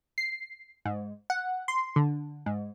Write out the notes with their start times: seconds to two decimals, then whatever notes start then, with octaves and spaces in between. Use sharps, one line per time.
0.18 C7
0.85 G#2
1.30 F#5
1.68 C6
1.96 D3
2.46 G#2